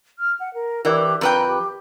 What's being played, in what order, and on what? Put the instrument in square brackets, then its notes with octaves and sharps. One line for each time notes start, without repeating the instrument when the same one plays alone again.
[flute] F6
F#5
A#4
[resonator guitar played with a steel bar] E3 [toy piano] E4 A#4 D5 [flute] G4
[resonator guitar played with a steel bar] F2 B4 G5 [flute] A#5
[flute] G4